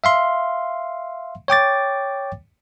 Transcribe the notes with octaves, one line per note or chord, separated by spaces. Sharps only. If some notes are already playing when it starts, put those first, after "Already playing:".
E5 F5 C6
C#5 G5 D6 A6